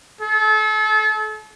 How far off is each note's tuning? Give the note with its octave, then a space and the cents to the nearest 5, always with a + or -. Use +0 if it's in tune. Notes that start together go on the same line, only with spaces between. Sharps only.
A4 -35